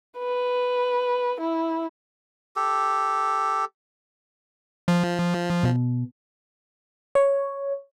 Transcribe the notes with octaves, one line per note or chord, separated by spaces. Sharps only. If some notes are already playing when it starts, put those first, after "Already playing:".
B4
E4
G4 A4
F3
B2
C#5